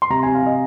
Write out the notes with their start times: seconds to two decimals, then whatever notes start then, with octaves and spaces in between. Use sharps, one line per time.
0.02 C6
0.10 C3 A#5
0.23 C3 G#5
0.35 F5
0.42 C3 D#5